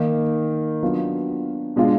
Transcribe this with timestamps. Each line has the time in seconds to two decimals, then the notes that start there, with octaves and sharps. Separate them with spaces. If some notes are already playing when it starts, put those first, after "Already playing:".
Already playing: D#3 A#3 D#4
0.83 F#3 B3 D4 F4
1.76 B2 G#3 D4 F4